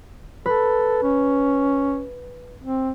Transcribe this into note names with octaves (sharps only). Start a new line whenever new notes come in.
A4 B4
C#4
C4